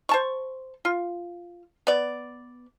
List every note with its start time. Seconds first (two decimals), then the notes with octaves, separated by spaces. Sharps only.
0.09 C5 A5 C#6
0.85 F4
1.87 B3 D5